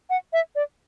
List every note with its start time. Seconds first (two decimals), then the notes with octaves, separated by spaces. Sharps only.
0.10 F#5
0.33 E5
0.55 D5